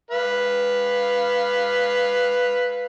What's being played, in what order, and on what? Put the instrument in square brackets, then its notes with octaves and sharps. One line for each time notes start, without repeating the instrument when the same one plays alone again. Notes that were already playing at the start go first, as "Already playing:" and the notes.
[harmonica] B4 F5